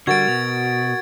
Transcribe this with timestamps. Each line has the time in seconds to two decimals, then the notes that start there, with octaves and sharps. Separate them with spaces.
0.07 D3 G3 F#4 A#4 F#5 G#6 A6 D7
0.28 B2